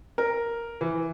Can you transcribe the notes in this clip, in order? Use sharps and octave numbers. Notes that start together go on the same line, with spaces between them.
A#4
E3